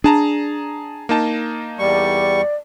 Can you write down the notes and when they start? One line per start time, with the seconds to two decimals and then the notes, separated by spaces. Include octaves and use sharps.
0.04 D4 G#4 A5 A#5
1.09 A#3 D#4 A5
1.79 E2 G3 D5 C#6